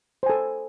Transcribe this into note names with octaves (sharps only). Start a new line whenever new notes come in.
A4 C5 G#5